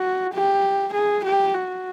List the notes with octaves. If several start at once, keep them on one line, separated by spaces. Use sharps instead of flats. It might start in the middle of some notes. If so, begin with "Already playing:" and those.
Already playing: F#4
G4
G#4
G4
F#4